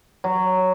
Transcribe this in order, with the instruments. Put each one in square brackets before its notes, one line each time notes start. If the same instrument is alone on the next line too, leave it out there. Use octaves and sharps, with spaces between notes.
[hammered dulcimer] F#3